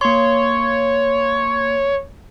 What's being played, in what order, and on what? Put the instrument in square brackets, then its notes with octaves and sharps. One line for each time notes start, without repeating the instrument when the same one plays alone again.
[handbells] A#3 C6 [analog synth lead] C#5